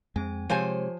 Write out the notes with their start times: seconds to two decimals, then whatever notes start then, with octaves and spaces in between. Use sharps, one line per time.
0.16 F2 G#3 C4 G#5
0.50 C3 F3 G#3 G4 C5 C#5 G#5